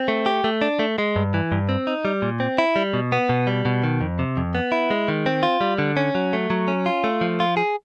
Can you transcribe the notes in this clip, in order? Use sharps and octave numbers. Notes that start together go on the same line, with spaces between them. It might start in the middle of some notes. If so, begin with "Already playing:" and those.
Already playing: C4
A3
G4
A3
D4
A3
G#3
G2
E3
G2
C4
D#4
G3
A#2
C4
E4
G3
B2
B3
B2
G3
B2
D#3
F2
C3
F2
B3
E4
G#3
D#3
C4
F4
G3
D3
C#4
F#3
A3
F#3
C#4
F4
A3
F3
F4
G#4